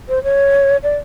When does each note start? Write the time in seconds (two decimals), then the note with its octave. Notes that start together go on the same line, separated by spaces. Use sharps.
0.09 C5
0.24 C#5
0.83 D5